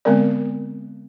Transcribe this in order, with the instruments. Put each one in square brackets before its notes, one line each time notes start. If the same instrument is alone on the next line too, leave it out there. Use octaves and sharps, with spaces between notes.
[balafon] D3 G#3 B3 C4 A#4 D5